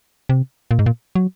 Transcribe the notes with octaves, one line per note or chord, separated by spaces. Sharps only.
C3
A#2
G#2
A#2
F#3